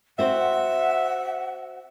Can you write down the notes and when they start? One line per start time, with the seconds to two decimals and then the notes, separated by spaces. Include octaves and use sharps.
0.19 C4 F#4 C5 E5 F#5